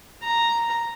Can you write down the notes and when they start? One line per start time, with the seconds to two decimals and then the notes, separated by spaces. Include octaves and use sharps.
0.22 A#5